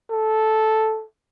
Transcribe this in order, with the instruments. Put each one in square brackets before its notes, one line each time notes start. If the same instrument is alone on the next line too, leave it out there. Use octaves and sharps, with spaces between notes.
[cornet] A4